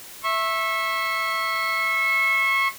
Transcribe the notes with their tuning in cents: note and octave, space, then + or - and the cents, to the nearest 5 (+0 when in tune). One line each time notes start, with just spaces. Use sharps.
E5 +0 C#6 -30